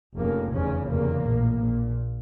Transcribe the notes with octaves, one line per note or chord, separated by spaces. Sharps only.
F1 F2 C#3 A#3
F1 E2 C#3 C#4
F1 E2 C#3 A#3
A#1 A2
A#1 A#2